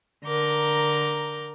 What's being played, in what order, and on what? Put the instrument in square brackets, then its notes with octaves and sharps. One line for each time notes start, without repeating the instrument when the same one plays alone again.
[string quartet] D3 A#4 A#5 D6 G6